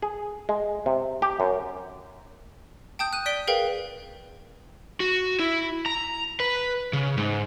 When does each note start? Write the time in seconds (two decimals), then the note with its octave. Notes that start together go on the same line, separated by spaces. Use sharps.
0.02 G#4
0.49 G#3
0.86 C3
1.22 G4
1.40 F#2
2.99 G5 A5 D#6 G6
3.13 F#6 D#7
3.26 D5 B6 D7 G7
3.47 G#4 A#4 B4 F5 G5
5.00 F#4
5.39 E4
5.86 A#5
6.40 B4
6.93 C#3
7.17 G#2